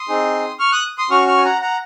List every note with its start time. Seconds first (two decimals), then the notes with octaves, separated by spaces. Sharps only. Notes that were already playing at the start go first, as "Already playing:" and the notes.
Already playing: C6 D#6
0.09 C4 D#4 G#4
0.59 C#6 F6
0.72 D#6 F#6
0.98 C6 D#6
1.10 C#4 F#4 C#6 F6
1.28 C#6 F6
1.37 G#5
1.45 F#5 A#5
1.61 F#5 A#5